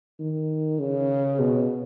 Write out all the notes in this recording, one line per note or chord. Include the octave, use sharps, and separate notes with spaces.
D#3
C#3
B2